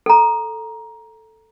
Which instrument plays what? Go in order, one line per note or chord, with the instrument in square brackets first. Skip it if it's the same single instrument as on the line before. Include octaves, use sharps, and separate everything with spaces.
[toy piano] A4 A#5